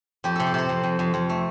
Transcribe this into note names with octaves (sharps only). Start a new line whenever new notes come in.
F2 G4
C3 A4
G4
C3 C5
F2
F2
F2
F2
A3